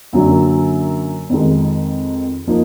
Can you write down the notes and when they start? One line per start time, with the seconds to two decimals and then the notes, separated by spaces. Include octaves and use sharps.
0.13 F#2 D3 F#3 A#3
1.30 F2 D#3 G#3
2.47 F3 A#3 D#4